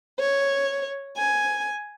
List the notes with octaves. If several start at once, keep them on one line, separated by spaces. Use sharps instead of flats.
C#5
G#5